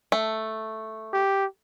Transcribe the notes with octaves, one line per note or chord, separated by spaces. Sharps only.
A3
G4